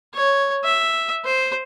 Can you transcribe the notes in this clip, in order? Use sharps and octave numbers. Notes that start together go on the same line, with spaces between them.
C#5
E5
C5